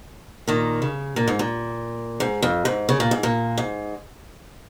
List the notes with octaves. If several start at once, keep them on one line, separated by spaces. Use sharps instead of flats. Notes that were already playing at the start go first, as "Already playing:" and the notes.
A#2 D#3
C#3
A#2
G#2
A#2
G#2
F2
G#2
C#3
A#2
G#2
A#2
G#2